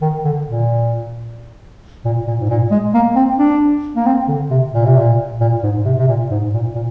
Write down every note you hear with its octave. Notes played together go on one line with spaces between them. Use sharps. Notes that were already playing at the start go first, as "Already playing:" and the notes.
D#3
D3
A#2
A#2
A#2
G#2
A#2
G#3
A#3
C4
D4
A#3
C4
D3
C3
A#2
C3
A#2
A#2
G#2
C3
C3
A#2
G#2
A#2
A#2